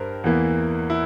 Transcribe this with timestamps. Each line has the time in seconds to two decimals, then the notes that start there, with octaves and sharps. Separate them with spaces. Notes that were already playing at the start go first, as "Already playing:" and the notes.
Already playing: G2 A#4 C5
0.24 E2 E3 A#3
0.90 E4